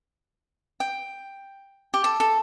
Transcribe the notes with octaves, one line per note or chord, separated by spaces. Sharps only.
G5
G4
A4
A4